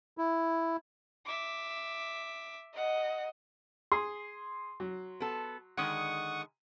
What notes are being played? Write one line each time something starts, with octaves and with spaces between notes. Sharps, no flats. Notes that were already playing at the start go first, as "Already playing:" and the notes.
E4
E5 D6
D#5 F#5
G#4 C6
F#3
B3 A4
D3 D#3 G#3 F#5 C#6 D#6